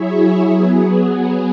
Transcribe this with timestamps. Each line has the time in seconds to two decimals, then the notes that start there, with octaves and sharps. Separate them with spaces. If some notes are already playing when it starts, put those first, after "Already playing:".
Already playing: F#3 E4 G#4 C#5 E5
0.45 F#3 B3 G#4